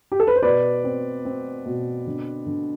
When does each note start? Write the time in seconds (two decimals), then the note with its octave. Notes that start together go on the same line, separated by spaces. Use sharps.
0.12 G4
0.20 A4
0.27 B4
0.36 C5
0.43 B2 B4 D5
0.84 C4
1.25 C4
1.66 B2
2.07 D3
2.46 D3